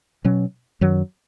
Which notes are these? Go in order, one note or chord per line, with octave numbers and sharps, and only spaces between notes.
B2 F#3 C#4
F#2 D#3 F#3